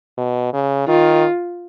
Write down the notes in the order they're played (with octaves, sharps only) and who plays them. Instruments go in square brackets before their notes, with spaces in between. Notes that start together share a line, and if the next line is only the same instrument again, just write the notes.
[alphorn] B2
C#3
[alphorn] D#3 [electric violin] F4